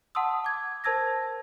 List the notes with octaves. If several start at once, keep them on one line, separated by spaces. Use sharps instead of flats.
F#5 A5 C6 D#6 E6
D6 G#6
A#4 C5 A5 E6 G#6 A#6